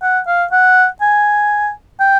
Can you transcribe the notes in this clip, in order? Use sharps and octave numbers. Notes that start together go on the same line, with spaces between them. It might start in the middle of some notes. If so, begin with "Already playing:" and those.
F#5
F5
F#5
G#5
G5